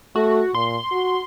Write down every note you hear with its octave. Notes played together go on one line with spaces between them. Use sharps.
A3 F#4
A#2 C6
F#4